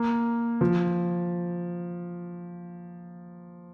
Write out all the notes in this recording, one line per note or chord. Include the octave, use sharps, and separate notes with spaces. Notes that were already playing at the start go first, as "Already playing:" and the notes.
Already playing: A#3
F3